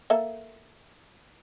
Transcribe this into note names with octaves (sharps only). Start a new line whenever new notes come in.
A#3 A4 E5